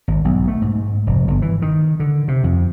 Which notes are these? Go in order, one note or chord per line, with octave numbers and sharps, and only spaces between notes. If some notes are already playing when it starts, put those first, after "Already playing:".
G#1
B1
A3
G#2
F1
G1
E3
D#3
D3
C3
F2